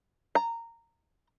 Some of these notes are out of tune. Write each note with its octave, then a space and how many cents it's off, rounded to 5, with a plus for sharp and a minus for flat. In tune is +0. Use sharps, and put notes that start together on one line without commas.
A#5 -15